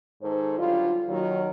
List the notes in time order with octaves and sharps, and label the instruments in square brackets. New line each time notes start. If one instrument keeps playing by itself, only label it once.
[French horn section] G#2 D#3 A4 C5
D3 F#3 G3 F4
D#2 D#3 F#3